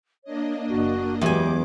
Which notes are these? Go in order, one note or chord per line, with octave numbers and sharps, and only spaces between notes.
A#3 D4 C#5 D#5
F#1 F#4
E2 F#3 G#3 B3 G4 G#5 D6